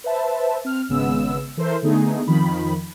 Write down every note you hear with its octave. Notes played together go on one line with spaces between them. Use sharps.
B4 C5 E5 A5
C4 F6
G#1 C#3 G#3 B3 E6
E3 A4 A#4 C5 E5
D3 A3 B3 D#4 G#4
F2 D#3 F3 B5